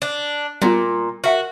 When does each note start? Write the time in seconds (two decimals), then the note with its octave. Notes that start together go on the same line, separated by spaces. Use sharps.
0.02 D4
0.62 A#2 G3 B3 F4
1.24 F#4 A#4 E5 F#5